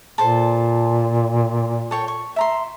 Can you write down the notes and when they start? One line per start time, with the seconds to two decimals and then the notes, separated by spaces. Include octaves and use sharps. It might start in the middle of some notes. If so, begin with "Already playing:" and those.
0.18 A#2 A4 C5 A5
1.91 A4 C#5 G5
2.08 C#6
2.36 E5 A#5 C6